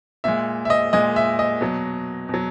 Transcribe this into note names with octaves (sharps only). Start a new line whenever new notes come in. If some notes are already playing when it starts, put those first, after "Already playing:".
A#2 G#3 E5
E5
D#5
A#2 G#3 D#5
E5
D#5
B2 F#3
B2 F#3